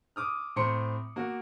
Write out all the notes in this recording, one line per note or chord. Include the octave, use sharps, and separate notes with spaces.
D6 D#6 F6
A2 C4 A#5 C6 C#7
A#3 F#4